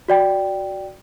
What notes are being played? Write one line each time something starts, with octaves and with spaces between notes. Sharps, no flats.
F#4 D5 G5